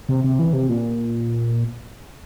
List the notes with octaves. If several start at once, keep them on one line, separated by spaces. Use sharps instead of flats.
C3
C3
E3
C3
A#2